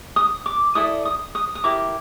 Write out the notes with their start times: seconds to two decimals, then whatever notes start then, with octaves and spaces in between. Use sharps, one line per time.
0.16 D#6
0.46 D6
0.75 E4 A4 D5 D#6
1.05 D#6
1.35 D#6
1.55 D#6
1.64 E4 G4 A#4 D6